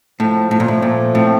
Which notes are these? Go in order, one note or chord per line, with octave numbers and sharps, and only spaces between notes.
A2 F3
A2
A#2
A2 A3
A#2
A2 C4